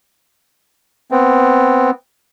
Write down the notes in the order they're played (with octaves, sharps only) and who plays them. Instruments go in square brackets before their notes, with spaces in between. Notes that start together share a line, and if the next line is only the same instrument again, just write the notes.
[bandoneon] B3 C4